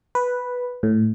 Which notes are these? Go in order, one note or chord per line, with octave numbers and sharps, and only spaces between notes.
B4
A2